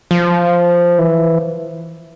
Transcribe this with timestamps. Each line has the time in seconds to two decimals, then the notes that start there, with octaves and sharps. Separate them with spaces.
0.11 F3
0.98 E3